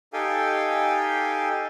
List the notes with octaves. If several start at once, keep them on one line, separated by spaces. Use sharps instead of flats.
D#4 G4 A4 F5 G5 G#5